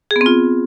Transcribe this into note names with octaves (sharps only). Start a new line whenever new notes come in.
G#4
B3
C4
F4